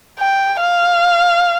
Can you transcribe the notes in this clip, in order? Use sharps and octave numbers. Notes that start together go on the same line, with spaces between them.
G5
F5